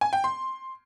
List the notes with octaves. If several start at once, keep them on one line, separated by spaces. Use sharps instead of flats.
G#5
G5
C6